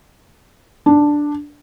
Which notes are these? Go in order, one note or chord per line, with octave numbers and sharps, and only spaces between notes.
D4